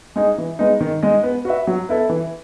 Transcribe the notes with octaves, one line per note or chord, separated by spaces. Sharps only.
G#3 D#4 G#4
E3
G#3 B3 D#4
D#3
G#3 D#4 G#4 D#5
B3
F#4 B4 E5
F#3
B3 E4 A4
E3